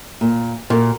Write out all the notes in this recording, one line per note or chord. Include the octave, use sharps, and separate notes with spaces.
A#2
A#2 F#4 A#4